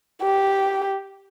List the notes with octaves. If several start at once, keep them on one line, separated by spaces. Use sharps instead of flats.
G4